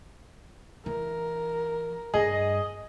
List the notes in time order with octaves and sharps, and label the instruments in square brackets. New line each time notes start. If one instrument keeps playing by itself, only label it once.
[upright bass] E3 [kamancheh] A#4
[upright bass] G2 [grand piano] G#4 [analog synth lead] D#5